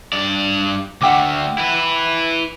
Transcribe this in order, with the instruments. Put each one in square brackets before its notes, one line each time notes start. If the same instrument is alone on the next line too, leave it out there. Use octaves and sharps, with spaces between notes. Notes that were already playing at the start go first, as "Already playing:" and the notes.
[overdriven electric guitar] G2 D5
[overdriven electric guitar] D2 A3 [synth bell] F#5 G5 D6
[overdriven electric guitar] E4 B4